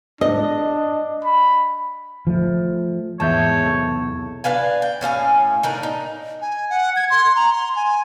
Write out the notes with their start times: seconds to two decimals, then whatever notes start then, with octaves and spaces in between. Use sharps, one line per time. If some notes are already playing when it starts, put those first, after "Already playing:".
0.21 D4 D#5
1.24 B5
2.27 F3 A3
3.20 E2 G#2 G#3 C#5 E5 A5 G6
3.63 B1 C3 A4
4.44 D4 B4 F5 G#5
4.82 G5
5.01 A2 C#4 F5 G#5
5.63 D4 D#4 A#4
5.83 D#4
6.41 G#5
6.70 F#5
6.96 G#6
7.10 C6
7.36 A#5
7.53 C6
7.76 G#5